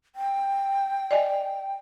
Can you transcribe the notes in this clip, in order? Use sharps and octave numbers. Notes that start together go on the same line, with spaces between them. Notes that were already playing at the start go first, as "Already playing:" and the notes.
G5
D5 D#5 G#5